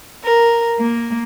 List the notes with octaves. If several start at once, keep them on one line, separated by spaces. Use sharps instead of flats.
A#4
A#3